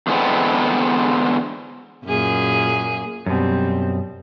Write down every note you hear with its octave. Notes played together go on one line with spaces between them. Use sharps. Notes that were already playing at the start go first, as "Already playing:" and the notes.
E2 D3 G#3 B3 C4
F#2 A#2 G#4
F#2 B2 G3 C4